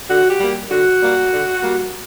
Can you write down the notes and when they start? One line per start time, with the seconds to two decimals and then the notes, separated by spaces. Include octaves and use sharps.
0.08 D3 F#4
0.30 G4
0.40 G3 A#3
0.70 D3 F#4
1.01 G3 A#3
1.32 D3
1.63 G3 A#3